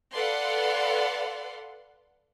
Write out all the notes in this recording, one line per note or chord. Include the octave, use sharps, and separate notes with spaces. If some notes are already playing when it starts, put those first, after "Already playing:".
A4 B4 D5 F5 F#5 C6